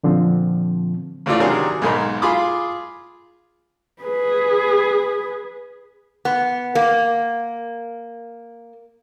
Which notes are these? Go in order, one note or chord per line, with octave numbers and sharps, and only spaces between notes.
A#2 D3 F3 C4
G#2 C#3 E3 A3 F4 D5
C3 D#3 F#3 D4 G#4 A#4
B1 G#2 G#3 D#4 A#4 B5
F4 G#4 B5 C6 D6 D#6
G#4 B4
B3
A#3